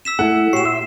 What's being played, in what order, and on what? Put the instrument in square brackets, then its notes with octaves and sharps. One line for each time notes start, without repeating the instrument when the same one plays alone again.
[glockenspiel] E6 B6 E7
[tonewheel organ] A3 [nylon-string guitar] E4 A4 [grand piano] F#5
[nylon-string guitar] A#2 [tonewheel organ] F#4 G4 C#5 [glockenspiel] C7 E7
[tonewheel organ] E5 C6 E6